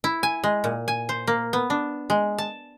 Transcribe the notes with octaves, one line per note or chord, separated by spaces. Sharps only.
E4
G#5
G#3
A#2
G#5
C5
A#3
B3
D4
G#3
A5